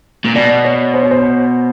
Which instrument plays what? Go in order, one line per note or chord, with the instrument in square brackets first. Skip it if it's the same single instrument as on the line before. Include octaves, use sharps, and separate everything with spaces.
[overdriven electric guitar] A#2
[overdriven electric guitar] B2 [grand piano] D5
[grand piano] C#5
C5
C#5
C5